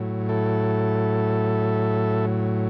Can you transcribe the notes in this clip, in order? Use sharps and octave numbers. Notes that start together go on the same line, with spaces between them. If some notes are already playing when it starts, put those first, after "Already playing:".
Already playing: A2 F#3
E4 A4